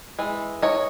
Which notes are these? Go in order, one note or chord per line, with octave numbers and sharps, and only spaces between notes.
E3 G#3
C#5 D#5